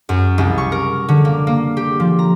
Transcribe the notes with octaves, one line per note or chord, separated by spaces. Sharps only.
F#2
C2
C#6
A#4
D3
A#3
A#3
G4
F3
A#5